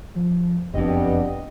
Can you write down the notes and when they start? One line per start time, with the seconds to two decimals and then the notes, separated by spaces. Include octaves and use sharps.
0.15 F3
0.74 F#1 F2 B3 D4 G4 D#5